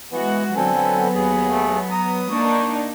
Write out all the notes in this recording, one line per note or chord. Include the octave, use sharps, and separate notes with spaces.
E3 G#3 B3 F#4
D3 F#3 B3 C4 A4 G#5
D#2 G#4
A3
A#5 D#6
A#3 D4 D#4 C#6